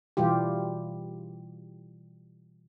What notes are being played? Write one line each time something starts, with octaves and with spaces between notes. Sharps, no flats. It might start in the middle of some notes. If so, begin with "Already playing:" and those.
B2 E3 G3 F4 G4